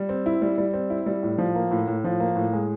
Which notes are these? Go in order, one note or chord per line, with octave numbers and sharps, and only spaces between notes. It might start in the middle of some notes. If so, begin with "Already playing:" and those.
Already playing: G3
C4
E4
G3
G3
C4
E4
G3
A2
F3
A#3
A2
A2
F3
A#3
A2
G#3